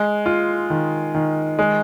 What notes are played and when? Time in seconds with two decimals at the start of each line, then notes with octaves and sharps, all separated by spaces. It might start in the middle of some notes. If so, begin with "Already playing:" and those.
Already playing: G#3
0.26 F4
0.70 D#3
1.15 D#3
1.59 G#3